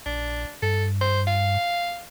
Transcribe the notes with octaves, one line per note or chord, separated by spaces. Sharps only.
A#1 D4
G2 A4
C5
F5